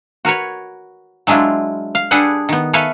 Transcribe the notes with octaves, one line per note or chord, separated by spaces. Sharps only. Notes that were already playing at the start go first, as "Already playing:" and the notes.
F#4 A#4 B4 C#5
F#3 G#3 D4 E4 F4
F5
G3 D4 G#4 A4 B4 F#5
D#3 B3
A4 B4 C#5 E5 F5 G#5